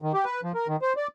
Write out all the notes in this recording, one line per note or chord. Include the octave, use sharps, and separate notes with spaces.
D#3
G4
B4
F3
A#4
D#3
C5
D5